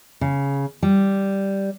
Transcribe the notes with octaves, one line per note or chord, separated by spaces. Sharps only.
C#3
G3